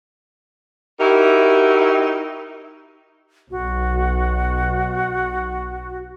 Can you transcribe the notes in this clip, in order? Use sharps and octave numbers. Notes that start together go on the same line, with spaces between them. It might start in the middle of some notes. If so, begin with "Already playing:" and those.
D#4 E4 F#4 G4 A#4
B1 F#4